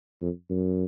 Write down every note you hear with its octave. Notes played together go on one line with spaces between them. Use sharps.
F2
F#2